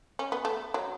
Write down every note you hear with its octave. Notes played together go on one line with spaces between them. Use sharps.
C#4
B3
A3
F#3